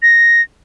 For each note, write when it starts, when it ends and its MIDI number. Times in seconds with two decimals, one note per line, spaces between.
0.02 0.42 94